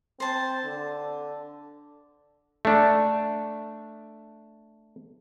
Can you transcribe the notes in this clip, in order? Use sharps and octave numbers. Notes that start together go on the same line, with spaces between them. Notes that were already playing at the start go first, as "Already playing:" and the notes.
C4 C5 A5
D3
A3 D4